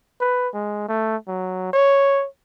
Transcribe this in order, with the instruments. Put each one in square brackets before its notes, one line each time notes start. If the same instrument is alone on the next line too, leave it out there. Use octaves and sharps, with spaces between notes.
[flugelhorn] B4
G#3
A3
F#3
C#5